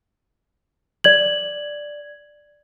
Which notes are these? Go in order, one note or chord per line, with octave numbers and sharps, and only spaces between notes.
D5 G#6 F#7